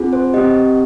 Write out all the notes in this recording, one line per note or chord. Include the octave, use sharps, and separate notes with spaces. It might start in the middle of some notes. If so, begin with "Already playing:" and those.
Already playing: C4 F4 G#4
C5
C4 G4 D#5